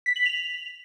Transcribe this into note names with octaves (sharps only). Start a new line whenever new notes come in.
B6
F#7
F7